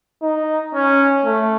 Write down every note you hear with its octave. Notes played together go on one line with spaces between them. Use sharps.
D#4
C#4
A3